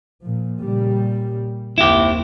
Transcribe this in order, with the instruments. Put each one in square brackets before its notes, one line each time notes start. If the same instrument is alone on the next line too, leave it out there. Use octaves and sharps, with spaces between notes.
[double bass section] A#2 F3
A#2 C#3 G3
[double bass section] F#1 D#2 C4 [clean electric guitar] E4 G4